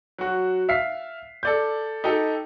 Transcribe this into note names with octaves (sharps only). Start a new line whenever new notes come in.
F#3 F#4
E5 F5 B6 C7
A4 D5 G6
D#4 G4 A4